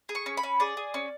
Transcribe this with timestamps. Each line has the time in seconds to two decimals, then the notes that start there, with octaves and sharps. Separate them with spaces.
0.09 G#4
0.15 C#6
0.26 C#4
0.37 B5
0.43 C#4
0.60 G#4 D5
0.77 G#4
0.94 C#4